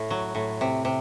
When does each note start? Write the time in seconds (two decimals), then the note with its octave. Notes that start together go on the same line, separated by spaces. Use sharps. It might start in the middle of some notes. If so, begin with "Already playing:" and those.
Already playing: A2
0.10 F#3
0.35 A2
0.61 C3
0.85 C3